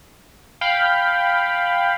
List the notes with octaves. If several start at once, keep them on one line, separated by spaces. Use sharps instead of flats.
F5 G5 B5